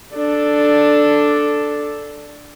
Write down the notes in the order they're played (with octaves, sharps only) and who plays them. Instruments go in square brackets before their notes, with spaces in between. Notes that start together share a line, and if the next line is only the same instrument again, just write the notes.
[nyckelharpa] D4 A4